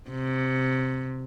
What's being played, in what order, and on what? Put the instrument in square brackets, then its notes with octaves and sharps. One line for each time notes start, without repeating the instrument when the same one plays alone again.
[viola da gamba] C3